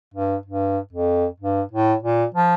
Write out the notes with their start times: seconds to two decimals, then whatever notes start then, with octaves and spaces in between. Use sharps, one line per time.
0.14 G2
0.46 G2
0.93 F2
1.40 G2
1.72 A2
2.03 A#2
2.35 F3